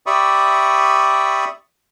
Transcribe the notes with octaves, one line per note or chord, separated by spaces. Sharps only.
G4 D5 E5 B5 C#6 D#6